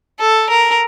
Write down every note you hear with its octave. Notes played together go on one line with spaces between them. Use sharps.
A4
A#4